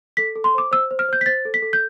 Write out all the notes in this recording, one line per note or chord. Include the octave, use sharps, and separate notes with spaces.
A4 B6
A4
C6
C5 D6
C5 E6
C5
F6
C5 G6
B6
C5 A6
A4
B6
A4
G6